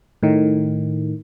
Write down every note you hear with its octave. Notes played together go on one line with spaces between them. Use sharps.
A2 D#3